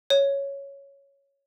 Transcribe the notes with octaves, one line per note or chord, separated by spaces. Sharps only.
C#5